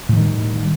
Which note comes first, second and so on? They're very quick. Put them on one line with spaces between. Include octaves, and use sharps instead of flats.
A2 E3 D#3 G3